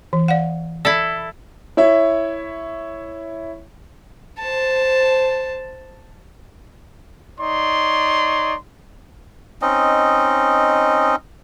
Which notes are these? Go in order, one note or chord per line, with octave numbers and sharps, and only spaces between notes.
E3
D5 F5 F#5
E4 A4 D5
E4 C#5 E5
C5 A5
D#4 C#5 D5 C6
C4 C#4 D#4 D#5